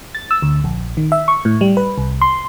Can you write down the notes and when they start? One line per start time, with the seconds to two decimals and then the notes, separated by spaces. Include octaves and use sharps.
0.15 A6
0.31 E6
0.42 D2
0.64 A#1
0.97 D#3
1.12 E5
1.28 C#6
1.45 A2
1.61 G3
1.77 B4
1.98 C2
2.21 C6